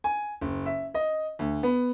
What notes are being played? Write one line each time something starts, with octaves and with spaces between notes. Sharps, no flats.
G#5
F#1
E5
D#5
D2
B3